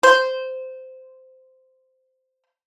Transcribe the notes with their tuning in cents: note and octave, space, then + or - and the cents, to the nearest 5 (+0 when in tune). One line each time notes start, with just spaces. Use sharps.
C5 -10